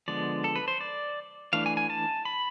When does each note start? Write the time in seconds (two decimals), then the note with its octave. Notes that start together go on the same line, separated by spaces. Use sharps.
0.08 D3 F3 G#3 B3 D5
0.44 A4
0.56 B4
0.68 C5
0.81 D5
1.53 E3 A3 D4 F5
1.66 G#5
1.77 G#5
1.90 A5
2.25 B5